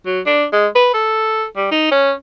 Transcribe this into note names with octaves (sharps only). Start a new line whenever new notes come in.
F#3
D4
G#3
B4
A4
G3
D#4
C#4